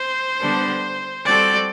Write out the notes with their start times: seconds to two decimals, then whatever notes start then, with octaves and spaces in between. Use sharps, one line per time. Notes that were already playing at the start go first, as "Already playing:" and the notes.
Already playing: C5
0.39 D3 G3 B3 D4 A4
1.26 G3 C4 F#4 A4 D5